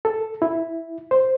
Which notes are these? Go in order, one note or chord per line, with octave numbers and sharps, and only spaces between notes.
A4
E4
C5